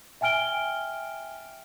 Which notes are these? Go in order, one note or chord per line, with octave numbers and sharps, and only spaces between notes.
E5 G5 G#5 F6 D7 G7